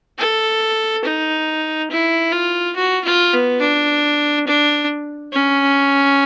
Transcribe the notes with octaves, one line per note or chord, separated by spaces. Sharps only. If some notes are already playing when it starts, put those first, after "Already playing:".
A4
D#4
E4
F4
F#4
F4
B3
D4
D4
C#4